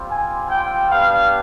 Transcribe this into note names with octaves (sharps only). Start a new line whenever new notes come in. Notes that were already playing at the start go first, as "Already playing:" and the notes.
Already playing: G3 C4 F4
G#5
G5
B3 D4 G4 F5